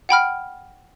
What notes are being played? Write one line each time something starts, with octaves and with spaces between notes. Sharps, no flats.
F#5 G5 B5 F6